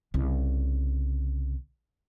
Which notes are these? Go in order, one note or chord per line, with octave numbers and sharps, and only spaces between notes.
C2 C#3